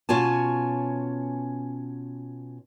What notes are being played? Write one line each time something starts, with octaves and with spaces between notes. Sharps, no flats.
B2 C#4 F4 C#5 G#5 A5